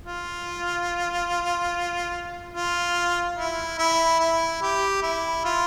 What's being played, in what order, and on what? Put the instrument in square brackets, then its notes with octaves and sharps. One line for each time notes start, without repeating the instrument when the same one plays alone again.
[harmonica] F4
F4
E4
E4
E4
G4
E4
F4